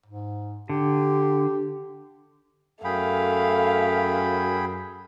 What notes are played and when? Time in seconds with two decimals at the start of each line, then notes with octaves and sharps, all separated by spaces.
0.06 G#2
0.69 D3 G4
2.84 F#2 A3 G#4 F5 G5 B5